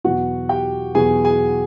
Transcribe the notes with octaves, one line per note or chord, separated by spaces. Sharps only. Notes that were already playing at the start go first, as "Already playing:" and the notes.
E2 B2 F#3 F#4 F#5
G4 G5
E2 B2 F#3 G#4 G#5
G#4 G#5